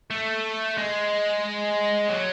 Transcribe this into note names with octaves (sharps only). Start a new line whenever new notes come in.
A3
G#3
F#3